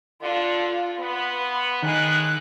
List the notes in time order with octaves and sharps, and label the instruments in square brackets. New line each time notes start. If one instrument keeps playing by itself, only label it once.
[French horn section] D3 D4 [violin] F4
[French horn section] B3 [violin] B5 C6
[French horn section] A2 G#3 [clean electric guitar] D#3 [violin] F#6